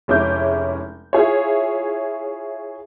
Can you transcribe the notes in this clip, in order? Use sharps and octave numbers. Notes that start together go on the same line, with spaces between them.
F1 G#3 C#4 E4 D6 G6
E4 F4 G#4 C#5